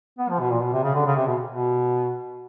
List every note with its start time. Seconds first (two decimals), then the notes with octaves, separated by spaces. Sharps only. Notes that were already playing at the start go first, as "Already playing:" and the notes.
0.19 B3
0.30 F3
0.40 B2
0.51 A#2
0.62 B2
0.73 C3
0.84 C#3
0.95 D3
1.06 C#3
1.16 C3
1.27 B2
1.49 B2